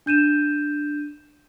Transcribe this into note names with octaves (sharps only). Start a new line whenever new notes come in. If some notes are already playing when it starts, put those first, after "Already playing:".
D4 G6 D#7 E7